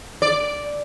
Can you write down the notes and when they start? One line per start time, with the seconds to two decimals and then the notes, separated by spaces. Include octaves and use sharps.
0.22 D5